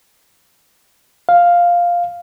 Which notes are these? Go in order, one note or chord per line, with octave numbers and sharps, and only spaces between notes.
F5